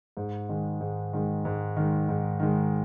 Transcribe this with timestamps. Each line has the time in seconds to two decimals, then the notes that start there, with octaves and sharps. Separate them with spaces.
0.17 G#2
0.49 D#3 G#3
0.81 G#2
1.13 D#3 G#3
1.45 G#2
1.77 D#3 G#3
2.09 G#2
2.40 D#3 G#3